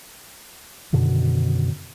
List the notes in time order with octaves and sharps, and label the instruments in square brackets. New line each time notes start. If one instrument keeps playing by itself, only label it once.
[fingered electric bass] F#2 B2 D3 D#3